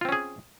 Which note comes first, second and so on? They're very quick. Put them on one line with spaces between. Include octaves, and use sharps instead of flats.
F4 C4 C#4 G#4